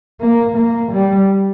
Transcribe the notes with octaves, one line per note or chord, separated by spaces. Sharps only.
A#3
A#3
G3